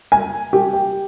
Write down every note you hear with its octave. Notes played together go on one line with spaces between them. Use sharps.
G#5
G4
G5